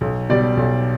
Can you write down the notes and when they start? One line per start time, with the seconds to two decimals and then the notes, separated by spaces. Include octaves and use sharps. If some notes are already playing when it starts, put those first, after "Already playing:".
0.01 B1
0.29 B2 G3 D5
0.57 B1